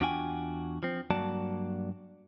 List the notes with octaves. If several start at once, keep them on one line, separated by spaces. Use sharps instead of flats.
E2 D4 F4 F#4 G5 G#5
F3 C4
G2 F#3 A#3 F#4 D5 A5